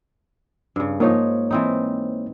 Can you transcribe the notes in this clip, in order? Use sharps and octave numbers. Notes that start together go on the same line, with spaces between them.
G2 C#3
G#2 F3 A#3 D#4 C#5
E3 C4 D#4